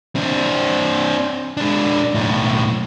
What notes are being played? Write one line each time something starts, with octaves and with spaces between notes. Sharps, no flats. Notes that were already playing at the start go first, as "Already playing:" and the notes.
C4 D4
G#3 D4
B1 A2